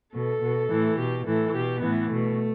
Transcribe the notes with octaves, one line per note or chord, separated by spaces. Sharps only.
B2 A4
B2
A2 E3
B2 G4
A2 E3 A4
B2 G4
A2 E3 B3
B2 A3